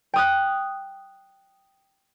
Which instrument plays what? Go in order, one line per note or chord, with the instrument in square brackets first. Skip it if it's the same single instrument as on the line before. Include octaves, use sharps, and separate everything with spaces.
[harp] G5 D#6 F#6